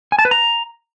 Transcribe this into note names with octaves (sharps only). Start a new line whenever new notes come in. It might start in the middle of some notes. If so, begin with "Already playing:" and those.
G#5
A5
B4
A#5